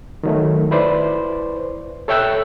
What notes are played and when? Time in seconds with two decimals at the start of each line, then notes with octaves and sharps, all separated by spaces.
0.23 D#3 F#3 A3
0.71 E4 B4 C5 D5
2.08 A4 C#5 E5 G5 E6 F#6